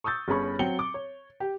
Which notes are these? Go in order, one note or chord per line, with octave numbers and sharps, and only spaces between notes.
C#6 D#6 E6 G6 A6
G1 C#4 G#4 B5 C#6
F#3 C4 G5 C#7 G7
D6
C#5
G4 G5